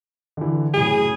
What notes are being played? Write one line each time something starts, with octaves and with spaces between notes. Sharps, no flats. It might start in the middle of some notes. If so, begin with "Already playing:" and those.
D3 E3
F#2 A2 C#3 G#4